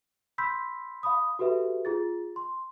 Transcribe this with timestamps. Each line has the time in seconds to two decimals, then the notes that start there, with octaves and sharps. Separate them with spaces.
0.38 B5 C6 E6 G6 B6
1.03 F5 B5 D#6
1.39 F#4 G4 A4 B4 E5
1.85 F4 G#4 A6
2.36 C6